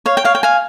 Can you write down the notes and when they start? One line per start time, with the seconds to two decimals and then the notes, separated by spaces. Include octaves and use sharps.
0.06 C#5 F5
0.17 G5
0.24 C#5 F5
0.35 G5
0.43 F5 G#5